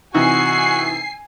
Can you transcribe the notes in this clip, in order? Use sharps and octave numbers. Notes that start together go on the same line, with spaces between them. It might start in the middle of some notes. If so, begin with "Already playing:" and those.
C3 E3 D#4 F#4 G#5 C7